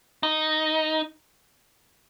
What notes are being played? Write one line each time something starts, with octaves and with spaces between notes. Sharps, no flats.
D#4